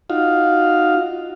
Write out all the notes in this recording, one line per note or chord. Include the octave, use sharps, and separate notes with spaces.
D#4 F4 F#4 F5